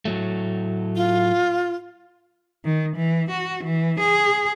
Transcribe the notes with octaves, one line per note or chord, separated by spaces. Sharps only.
A2 F#3 A3
F4
D#3
E3
F#4
E3
G#4